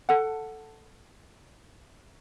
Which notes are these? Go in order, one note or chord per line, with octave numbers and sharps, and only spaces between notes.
A4 F#5